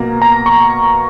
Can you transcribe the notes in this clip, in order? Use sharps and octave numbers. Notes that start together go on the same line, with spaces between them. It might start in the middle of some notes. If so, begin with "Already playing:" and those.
Already playing: B2 A#3 A#5
A#5
C#6